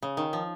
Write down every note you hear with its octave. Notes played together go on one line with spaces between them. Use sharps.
C#3
D#3
F3